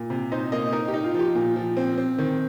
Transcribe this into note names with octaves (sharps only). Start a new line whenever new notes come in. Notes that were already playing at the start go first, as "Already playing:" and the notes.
Already playing: A#2
C3
D#4 C5
A#3 D#5
D#4 A#4
G4
D#4
F4
F3 G4
A#2
F3
C4
C4
D#3